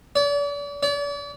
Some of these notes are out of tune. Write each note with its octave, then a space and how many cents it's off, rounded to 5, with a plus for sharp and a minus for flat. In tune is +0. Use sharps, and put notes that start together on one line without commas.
D5 -40
D5 -40